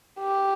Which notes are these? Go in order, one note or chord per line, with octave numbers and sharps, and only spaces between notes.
G4